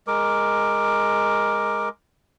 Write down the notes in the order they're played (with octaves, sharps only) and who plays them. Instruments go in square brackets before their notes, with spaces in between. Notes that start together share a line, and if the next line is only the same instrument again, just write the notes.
[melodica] G#3 A#4 D6